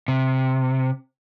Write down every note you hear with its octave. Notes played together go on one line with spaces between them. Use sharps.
C3